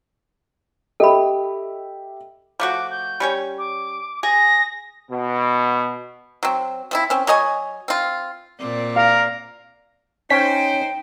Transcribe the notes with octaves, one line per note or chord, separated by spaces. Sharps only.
G4 A4 D#5 E5 B5
F3 A3 F#4 D6
G6
G3 C#4 C#5
D6
G#4 A#6
B2
F#3 C4
F3 C4 E4
C4 C#4
F#3 C#5 D#5 G#5
C4 F4
A#2 C4 D5
A#4 F5
C#4 D#4 C5 G5 B6